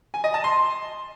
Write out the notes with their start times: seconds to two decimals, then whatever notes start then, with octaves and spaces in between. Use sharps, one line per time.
0.14 G#5
0.24 D#5
0.34 A5
0.44 C6